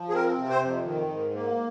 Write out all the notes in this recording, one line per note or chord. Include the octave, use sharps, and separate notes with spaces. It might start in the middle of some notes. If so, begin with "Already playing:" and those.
Already playing: F3
G#4
C4 A#4
C3
C5
F2
D#3
G#2
A#3